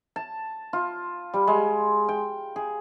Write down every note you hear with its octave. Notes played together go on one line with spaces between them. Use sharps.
A5
F4
G3
G#3
G5
G#4